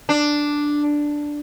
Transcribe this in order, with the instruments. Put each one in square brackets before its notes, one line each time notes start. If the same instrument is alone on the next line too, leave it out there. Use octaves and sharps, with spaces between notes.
[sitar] D4